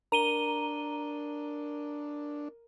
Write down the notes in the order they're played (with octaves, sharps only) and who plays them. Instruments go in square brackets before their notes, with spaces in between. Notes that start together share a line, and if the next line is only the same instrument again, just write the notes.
[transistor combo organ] D4 [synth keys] A#4 [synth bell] A#5 D#7 G7